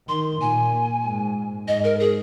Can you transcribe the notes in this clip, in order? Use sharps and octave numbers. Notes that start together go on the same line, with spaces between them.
D#3 C6
A#2 G#5
G#2
G#2 D#5
A#4
G#4